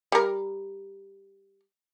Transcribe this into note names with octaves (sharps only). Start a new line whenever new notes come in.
G3 A#4